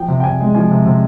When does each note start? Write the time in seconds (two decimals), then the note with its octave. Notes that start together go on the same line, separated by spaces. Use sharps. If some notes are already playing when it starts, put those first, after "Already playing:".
Already playing: F3 G5
0.08 C3
0.20 G5
0.24 C3 G#5
0.40 G#3
0.55 F3 G#5
0.71 C3
0.86 C3